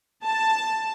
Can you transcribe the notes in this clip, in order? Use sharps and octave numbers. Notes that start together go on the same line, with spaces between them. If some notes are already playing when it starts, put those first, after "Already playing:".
A5